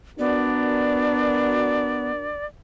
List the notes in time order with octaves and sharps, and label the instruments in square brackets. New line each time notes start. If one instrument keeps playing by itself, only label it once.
[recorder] B3 [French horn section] D4 F#4 A#4 [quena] D5